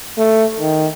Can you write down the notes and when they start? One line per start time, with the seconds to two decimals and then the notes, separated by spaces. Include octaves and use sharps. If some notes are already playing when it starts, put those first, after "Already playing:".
0.18 A3
0.60 D#3